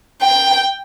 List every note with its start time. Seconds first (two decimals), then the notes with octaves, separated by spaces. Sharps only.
0.22 G5